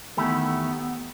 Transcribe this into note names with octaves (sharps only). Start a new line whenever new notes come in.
E2 D#3 A3 B3 E4 G4